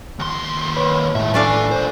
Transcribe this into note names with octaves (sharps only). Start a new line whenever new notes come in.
D#2 C6
B4 C#5 B5
A2 G#3 E5
A3 D4 B4 F5 G#5
A#2 C5